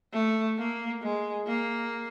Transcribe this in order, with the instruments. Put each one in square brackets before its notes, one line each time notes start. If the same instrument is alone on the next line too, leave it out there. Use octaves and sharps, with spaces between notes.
[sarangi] A3
A#3
G#3
A#3